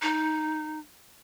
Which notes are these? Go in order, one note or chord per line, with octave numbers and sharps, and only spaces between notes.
D#4